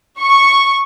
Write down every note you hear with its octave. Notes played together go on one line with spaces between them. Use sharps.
C#6